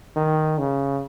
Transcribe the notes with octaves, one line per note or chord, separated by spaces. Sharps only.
D#3
C#3